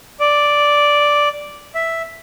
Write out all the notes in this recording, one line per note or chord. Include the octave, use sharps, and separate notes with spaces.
D5
E5